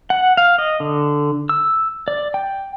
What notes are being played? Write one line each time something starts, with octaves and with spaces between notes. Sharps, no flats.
F#5
F5
D#5
D3
E6
D5
G5